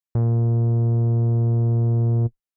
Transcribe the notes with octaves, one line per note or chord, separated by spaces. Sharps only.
A#2